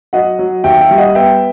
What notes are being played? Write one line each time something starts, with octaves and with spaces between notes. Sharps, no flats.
F#3 D#5 F#5
F#3
D#2 E5 G5
E5 G5
G3
D#5 F#5
B3 E5 G5